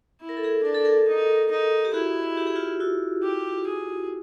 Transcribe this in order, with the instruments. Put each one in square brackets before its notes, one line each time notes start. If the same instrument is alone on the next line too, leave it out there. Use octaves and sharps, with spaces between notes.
[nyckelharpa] E4
[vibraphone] A#4
A4
G#4 A#4
[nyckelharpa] D4 [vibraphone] A#4
[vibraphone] A4
G#4 A#4
[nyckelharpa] D#4
D#4
[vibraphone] G4
[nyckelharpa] E4 [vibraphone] F#4 G#4
[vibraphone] G4
G#4
F4 G4
E4 F#4
[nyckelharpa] G4
G#4